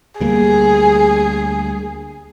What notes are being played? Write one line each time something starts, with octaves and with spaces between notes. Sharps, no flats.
D2 G3 A#3 G#4